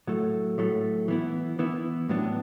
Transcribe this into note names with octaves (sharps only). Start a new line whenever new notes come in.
A2 F#3 A3
A2 F#3 A3
E3 B3 E4
E3 B3 E4
A2 F#3 B3 D4